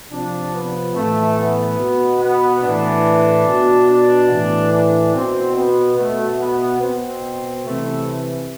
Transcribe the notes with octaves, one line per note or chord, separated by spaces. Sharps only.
C3 F3 D4
B3
A2 E3 A3
B3
B2
B3
A2 E3 D4
B2
D4
A2 E3
D4
B2 C4
B3
B2 A3
B3
B2 C4
C3 E3 A3